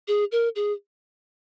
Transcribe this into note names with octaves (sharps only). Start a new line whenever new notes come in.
G#4
A#4
G#4